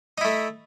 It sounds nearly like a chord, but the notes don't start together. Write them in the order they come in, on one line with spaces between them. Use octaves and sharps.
D#4 E4 A3